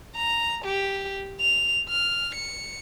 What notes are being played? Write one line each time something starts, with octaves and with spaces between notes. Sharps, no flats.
A#5
G4
F7
F6
C#7